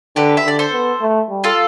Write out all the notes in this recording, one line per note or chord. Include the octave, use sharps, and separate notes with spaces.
D3 G4 B4
E5
D3 D5
A4 C5
B3
A3
G3
F4 A4